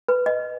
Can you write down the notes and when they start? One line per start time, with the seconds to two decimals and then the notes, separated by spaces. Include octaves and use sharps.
0.08 B4
0.26 D#5